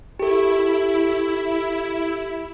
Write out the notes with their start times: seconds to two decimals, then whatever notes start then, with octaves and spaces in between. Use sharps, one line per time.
0.19 E4 G4 A4